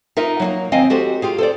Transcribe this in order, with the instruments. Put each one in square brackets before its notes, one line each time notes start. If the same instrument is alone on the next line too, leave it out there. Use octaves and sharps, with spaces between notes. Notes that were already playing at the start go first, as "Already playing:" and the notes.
[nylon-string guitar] D#4 F4 A#4 E5
F#3 G#3 A#3
D#2 C4 D#5 F5 G#5
F#4 G4 A4 C5
F4 G4 G#4
A4 C5 D5